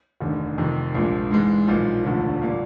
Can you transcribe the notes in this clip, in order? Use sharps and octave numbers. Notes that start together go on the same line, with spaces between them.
F1 D#2 D3
F2 C3 D#3
A#1 A#2 F3 G#3
G#2 E3 G#3
B1 A#2 F3
E1 D2 D3 F3
A#2 G3 A#3 D4